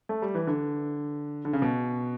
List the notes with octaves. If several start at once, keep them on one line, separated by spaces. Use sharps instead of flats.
A3
G3
E3
D3
D3
C#3
B2